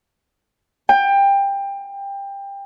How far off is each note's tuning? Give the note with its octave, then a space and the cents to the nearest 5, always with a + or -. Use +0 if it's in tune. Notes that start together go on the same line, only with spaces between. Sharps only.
G5 +20